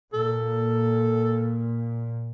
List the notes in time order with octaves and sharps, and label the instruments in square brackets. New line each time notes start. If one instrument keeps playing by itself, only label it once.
[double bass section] A#2 [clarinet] A4